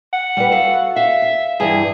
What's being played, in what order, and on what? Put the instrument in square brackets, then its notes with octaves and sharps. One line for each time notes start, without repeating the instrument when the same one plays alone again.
[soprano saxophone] F#5
[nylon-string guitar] G3 B4
F#4 A4 F5
[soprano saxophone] E5 [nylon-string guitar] F5
[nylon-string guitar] F5
[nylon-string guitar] G2 E3 [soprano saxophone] G#4